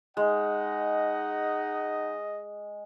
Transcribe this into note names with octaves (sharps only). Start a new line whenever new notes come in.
G#3 D#4 D#5 F#5